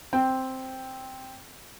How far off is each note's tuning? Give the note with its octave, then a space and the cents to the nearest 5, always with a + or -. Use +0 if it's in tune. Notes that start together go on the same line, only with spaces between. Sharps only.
C4 +0 G5 +0